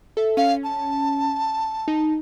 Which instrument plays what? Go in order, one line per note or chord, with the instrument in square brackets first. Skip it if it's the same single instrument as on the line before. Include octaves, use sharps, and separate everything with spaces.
[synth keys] A4 E5
[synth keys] C#4 [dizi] F5
[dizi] A5
[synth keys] D#4